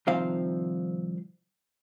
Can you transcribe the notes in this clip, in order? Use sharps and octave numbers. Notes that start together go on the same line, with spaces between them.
C2 D#3 F3 C4 F5